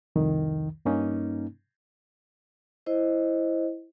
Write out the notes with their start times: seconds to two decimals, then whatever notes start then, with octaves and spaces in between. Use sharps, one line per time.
0.16 C2 F2 D#3
0.85 G2 A#3 C#4 D#4
2.86 E4 C5 D#5